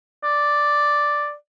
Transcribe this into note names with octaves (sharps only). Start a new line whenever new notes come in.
D5